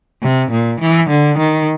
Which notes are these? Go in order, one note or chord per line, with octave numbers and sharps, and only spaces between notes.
C3
A#2
E3
D3
D#3